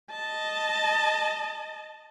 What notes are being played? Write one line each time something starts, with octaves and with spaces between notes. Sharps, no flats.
D#5 A5